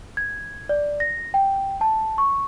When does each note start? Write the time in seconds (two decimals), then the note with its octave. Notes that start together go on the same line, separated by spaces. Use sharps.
0.17 G#6
0.69 D5
1.00 A#6
1.34 G5
1.81 A5
2.18 C#6